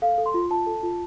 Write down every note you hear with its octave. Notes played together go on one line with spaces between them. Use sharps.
A4 F5
A4
C6
F4
F4 A5
A4
F4